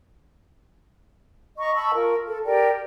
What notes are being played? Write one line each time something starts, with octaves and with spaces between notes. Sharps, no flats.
D#5 A#5 C#6
A5 B5 C#6 E6
F4 A#4
A4
G4 A#4 D5 G5